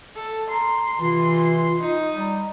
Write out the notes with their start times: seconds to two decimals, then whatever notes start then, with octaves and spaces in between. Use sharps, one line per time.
0.16 A4
0.50 A#5 C6
1.00 C3 E3 F4
1.80 D#4
2.15 G3 A#5